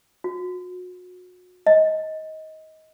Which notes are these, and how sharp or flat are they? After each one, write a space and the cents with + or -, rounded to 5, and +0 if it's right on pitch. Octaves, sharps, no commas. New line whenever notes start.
F#4 -35
D#5 +20